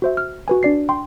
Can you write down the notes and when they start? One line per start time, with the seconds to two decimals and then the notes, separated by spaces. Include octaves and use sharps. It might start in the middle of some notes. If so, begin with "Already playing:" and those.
0.02 F#4 C5 E5
0.17 F6
0.48 F#4 B4 G#5
0.63 D4 D5 C7
0.89 G5 C6